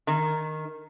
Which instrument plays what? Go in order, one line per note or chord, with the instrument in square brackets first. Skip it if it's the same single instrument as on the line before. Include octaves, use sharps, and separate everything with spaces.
[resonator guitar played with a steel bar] D#3